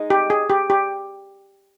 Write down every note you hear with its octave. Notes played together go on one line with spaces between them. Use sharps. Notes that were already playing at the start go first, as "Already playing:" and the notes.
Already playing: G#3 D#4
G4
G#4
G4
G4